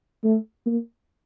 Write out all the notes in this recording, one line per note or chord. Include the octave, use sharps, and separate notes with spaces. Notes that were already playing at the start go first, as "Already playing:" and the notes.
A3
A#3